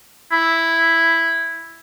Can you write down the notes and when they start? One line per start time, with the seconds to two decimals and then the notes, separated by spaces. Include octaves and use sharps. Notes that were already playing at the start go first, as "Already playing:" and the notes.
0.32 E4